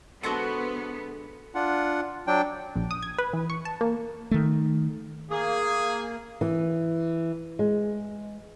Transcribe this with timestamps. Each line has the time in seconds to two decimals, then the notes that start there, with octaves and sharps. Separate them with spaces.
0.23 D3 G#3 B3 F#4 A4 C5 F#5
1.55 D4 F4 F#5
2.27 F#3 D4 G5
2.75 A#1
2.91 D#6
3.02 G#6
3.18 B4
3.33 E3
3.50 C#6
3.65 A5
3.81 A#3
4.31 D#3 A3
5.30 A#3 G#4
6.41 E3
7.59 G#3